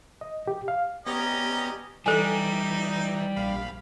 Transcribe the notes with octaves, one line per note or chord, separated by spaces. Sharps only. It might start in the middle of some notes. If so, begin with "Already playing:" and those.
D#5
G4
F5
B3 C#4 G4 D5 D#5 A#5
E3 G3 D#4 A4 G#5
A#1 F5 B5